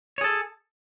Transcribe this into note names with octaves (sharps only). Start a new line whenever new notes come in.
G#4 A4 C#5